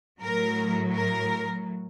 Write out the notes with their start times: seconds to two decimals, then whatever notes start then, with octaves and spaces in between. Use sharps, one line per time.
0.21 A2 F#3 A#4
0.94 A#4